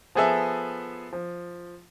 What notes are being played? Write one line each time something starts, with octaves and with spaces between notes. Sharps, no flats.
F3 B3 G#4 A4 E5
F3